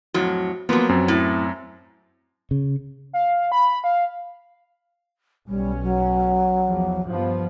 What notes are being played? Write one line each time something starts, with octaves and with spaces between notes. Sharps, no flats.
F2 A2 F#3
F3 F#3 A#3 B3
F#2 C4
A2
C#3
F5
B5
F5
B1 G3 C#4
F#3
E2 F3
G2 F3 B3